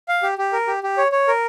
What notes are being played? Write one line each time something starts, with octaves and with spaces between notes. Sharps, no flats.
F5
G4
G4
A#4
G4
G4
C#5
C#5
A#4